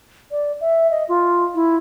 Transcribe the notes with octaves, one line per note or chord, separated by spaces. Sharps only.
D5
E5
D#5
F4
E4